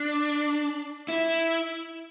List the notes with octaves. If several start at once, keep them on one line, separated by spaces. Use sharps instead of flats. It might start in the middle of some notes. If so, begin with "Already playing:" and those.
Already playing: D4
E4